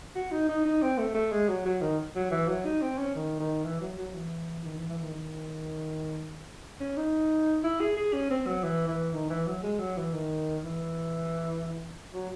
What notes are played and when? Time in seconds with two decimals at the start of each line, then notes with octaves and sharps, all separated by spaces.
0.15 F#4
0.32 D#4
0.49 D#4
0.65 D#4
0.82 C4
0.98 A3
1.14 A3
1.32 G#3
1.49 F#3
1.65 F#3
1.82 D#3
2.15 F#3
2.31 E3
2.48 F#3
2.65 D#4
2.82 C4
2.98 C#4
3.15 D#3
3.40 D#3
3.64 E3
3.81 F#3
3.98 F#3
4.15 E3
4.64 D#3
4.77 E3
4.89 E3
5.01 D#3
5.15 D#3
6.80 C#4
6.97 D#4
7.64 E4
7.80 G#4
7.97 G#4
8.13 C#4
8.30 C4
8.46 F#3
8.64 E3
8.88 E3
9.13 D#3
9.30 E3
9.47 F#3
9.63 G#3
9.80 F#3
9.97 E3
10.13 D#3
10.64 E3
12.13 F#3